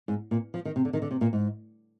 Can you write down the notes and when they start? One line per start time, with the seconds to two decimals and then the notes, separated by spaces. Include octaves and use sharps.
0.08 G#2
0.31 A#2
0.54 F3
0.65 D#3
0.76 C3
0.85 D3
0.93 D#3
1.02 D3
1.11 C3
1.21 A#2
1.33 G#2